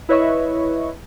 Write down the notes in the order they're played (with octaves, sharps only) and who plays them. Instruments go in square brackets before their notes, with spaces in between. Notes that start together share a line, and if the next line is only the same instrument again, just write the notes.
[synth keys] E4 B4 C#5 D#5 E5 C#6